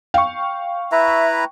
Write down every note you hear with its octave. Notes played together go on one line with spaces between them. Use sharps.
F5 G5 C#6
E4 B4 E5 A#5